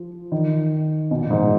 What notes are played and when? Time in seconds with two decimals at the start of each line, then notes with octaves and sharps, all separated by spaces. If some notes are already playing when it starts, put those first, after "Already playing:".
Already playing: F3
0.32 D#3
1.11 B2
1.21 A#2
1.31 G#2